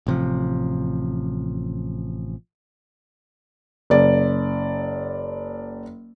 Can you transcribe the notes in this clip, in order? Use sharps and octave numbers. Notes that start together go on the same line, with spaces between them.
A1 C3 F3
F#1 D5